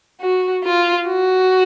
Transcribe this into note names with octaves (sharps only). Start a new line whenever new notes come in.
F#4
F4
F#4